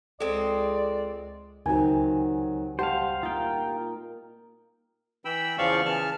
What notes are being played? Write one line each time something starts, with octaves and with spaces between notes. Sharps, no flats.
C#2 G#3 C4 A4 D5
C#2 C3 D#3 F#3 G#5
G3 C5 F5 F#5 A5
A#2 D#4 F4 G5
E3 G5 B5 E6
E2 C#3 F3 D5 F5 C#6
C#3 E3 A5 F6